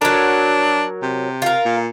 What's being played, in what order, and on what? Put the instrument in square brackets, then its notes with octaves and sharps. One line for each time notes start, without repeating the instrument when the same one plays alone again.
[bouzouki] F#3 A#4 [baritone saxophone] D4
[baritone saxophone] C3
[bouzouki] F4 A#4
[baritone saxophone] A#2